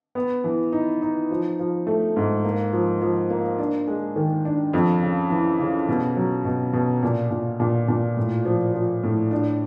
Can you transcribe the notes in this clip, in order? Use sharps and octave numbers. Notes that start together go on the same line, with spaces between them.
B3
E3
D#4
D#4
F3
F3
A3
G#2
A#3
F3
F3
A#3
D4
G#3
D#3
D4
F2
C#3
E3
C#3
B2
F#3
B2
B2
A#2
A#2
A#2
A#2
A2
F3
F3
A2
D4